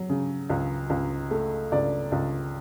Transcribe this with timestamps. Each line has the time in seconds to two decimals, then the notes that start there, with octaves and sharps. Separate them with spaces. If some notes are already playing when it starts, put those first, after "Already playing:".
Already playing: F#3
0.10 C#3
0.50 C#2
0.90 C#2
1.31 A3
1.72 C#2 D5
2.12 C#2